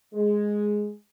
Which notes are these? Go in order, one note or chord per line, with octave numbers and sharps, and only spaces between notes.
G#3